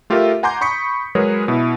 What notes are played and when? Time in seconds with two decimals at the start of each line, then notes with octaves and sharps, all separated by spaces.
0.10 A3 F4 G4 A4 A#4 E5
0.43 F#5 G#5 A#5 C6 D6 G6
0.61 B5 C#6 D#6 B6 C#7
1.15 F#3 G#3 G#4 A#4 B4 C#5
1.48 B2 E4